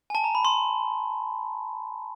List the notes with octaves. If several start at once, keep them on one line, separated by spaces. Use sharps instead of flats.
G#5
A5
A#5
B5
C6